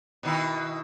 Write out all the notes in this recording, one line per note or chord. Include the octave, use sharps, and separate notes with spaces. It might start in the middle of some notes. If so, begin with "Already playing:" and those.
B2 D#3 E4